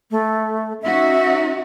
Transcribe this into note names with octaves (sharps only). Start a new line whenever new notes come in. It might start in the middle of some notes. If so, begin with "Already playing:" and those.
A3
C#4 D#4 F#4 E5